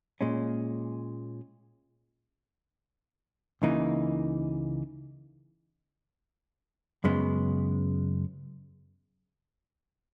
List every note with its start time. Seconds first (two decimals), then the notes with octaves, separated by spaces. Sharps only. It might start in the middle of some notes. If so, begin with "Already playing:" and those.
0.21 A#2 G#3 C#4
3.62 C#2 C#3 E3 A#3 D#4
7.04 F#2 C#3 G#3 B3